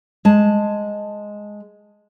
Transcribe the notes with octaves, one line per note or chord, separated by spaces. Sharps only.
G#3 A5